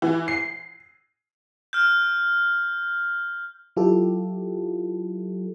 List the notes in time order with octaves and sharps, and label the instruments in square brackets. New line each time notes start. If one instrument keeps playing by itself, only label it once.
[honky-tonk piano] E3
C7
[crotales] F6 G6
[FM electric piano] F#3 E4 F4 G4 A4